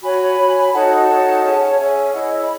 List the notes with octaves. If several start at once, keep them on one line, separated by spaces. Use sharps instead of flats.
F#4 C#5 G#5 B5
F#4 C#5
B5
D#4 F#4 A4 C#5 F#5 A5
D#4 F#4 A4 C#5
C#4 G#4 C#5
C#4 G#4 C#5 E5 G#5
E4 G#4 C#5 D#5 F#5
D#5
B5